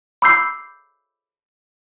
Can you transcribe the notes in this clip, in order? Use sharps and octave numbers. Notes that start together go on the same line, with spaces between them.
B5 D6 E6 G6 C7